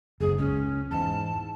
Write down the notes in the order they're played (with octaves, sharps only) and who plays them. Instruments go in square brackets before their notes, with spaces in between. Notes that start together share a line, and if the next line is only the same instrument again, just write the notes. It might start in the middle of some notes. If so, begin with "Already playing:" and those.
[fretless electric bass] F#1 G#2 [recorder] G#4
[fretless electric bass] C#2 [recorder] C#4
[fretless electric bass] E2 G#2 [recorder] A5